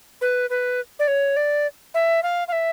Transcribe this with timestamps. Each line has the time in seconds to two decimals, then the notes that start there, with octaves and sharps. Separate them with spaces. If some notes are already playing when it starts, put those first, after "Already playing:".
0.21 B4
0.50 B4
0.99 D5
1.08 C#5
1.36 D5
1.94 E5
2.23 F5
2.48 F5
2.52 E5